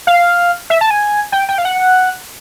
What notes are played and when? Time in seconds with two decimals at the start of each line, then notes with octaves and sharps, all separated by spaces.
0.07 F5
0.70 E5
0.81 A5
0.91 G#5
1.32 G5
1.49 G5
1.58 F5
1.65 F#5